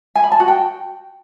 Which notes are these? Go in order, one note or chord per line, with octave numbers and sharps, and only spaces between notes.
G#5
B5
A5
F#4
G5